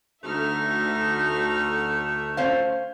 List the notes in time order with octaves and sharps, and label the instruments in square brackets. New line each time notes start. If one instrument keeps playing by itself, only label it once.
[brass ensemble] D2 [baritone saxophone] A3 [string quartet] D#4 E5 F6
[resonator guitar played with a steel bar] C#4 C5 F5